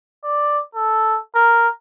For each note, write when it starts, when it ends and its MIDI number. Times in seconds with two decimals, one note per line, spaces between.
0.24 0.59 74
0.75 1.18 69
1.35 1.69 70